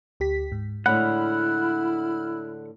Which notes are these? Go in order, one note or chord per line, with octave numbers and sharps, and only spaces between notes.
D2 G4 B6
G#2
A2 D3 G#3 E4 F#5 B5 F6